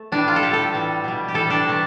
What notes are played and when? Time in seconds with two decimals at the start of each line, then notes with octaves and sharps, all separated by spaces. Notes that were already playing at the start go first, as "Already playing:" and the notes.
Already playing: A3
0.12 A2 E3 G3 D4
0.28 F4
0.36 A4
0.42 A2 G3 G4
0.53 A4
0.73 A2 E3 G3
1.04 B2 G3
1.28 G4
1.34 A2 E3 G3 A4
1.50 D4
1.65 C3 E3 A3